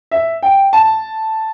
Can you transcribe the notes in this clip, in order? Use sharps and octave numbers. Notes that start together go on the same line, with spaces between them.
E5
G5
A5